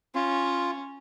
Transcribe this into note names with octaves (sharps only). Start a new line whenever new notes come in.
C#4 F4